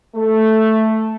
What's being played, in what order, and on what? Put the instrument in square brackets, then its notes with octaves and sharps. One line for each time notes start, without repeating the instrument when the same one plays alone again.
[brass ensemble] A3